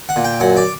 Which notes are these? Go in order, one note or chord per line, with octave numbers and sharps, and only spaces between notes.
F#5
A#2
G5
F#2 F#5
D5